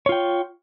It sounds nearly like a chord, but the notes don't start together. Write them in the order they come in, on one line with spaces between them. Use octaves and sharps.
C#5 F4 G5